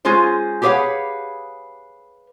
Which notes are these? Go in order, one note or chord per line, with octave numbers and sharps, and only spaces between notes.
G#3 C#4 F4 G#4 C5
G4 G#4 B4 C#5 F5 F#5